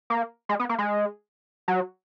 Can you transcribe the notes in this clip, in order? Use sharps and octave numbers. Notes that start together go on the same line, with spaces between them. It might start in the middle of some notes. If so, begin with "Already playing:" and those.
A#3
G#3
B3
A#3
G#3
F#3